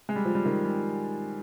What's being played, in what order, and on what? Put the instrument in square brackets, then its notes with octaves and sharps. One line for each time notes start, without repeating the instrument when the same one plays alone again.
[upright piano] G#3
G3
F3
G3
D#3
G3